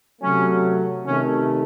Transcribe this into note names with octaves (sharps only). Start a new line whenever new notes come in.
C3 F#3 A3 C#4
C3 D#3 A3 C#4